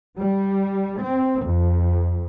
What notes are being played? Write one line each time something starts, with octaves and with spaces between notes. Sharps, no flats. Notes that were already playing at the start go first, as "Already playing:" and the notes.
G3
C4
F2